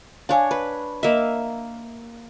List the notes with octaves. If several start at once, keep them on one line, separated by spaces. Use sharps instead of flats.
D4 C#5 F5 G#5
B4
A#3 D#5 E5